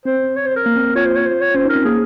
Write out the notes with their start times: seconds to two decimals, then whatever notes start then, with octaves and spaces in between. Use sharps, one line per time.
0.05 C4 C5
0.36 C#5
0.46 C5
0.56 A#4
0.66 A#3
0.76 C4
0.95 F4 C#5
1.05 C5
1.15 C#5
1.26 C5
1.41 C#5
1.55 C#4 C5
1.65 D#4
1.69 A#4
1.76 C4
1.85 A#3 G#4